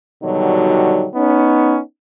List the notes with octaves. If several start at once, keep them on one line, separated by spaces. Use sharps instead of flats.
B2 D3 D#3 F#3 G3 D#4
B3 C#4 D#4